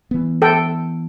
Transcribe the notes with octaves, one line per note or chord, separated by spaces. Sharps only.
E3 B3
A4 G5